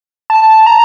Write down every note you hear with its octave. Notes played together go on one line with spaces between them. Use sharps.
A5
A#5